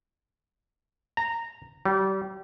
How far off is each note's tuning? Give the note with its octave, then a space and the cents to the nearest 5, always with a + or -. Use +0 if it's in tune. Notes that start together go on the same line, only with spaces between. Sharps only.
A#5 -15
G3 -30